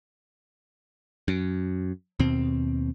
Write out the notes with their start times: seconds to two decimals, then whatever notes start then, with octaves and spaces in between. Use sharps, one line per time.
1.28 F#2
2.19 D#2 B2 C4